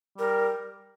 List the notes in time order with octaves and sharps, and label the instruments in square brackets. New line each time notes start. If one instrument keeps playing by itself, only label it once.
[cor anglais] G3 [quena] A#4